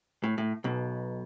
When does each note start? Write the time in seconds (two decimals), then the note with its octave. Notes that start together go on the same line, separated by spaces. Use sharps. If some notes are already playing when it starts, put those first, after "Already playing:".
0.24 A2
0.38 A2
0.64 B1 B2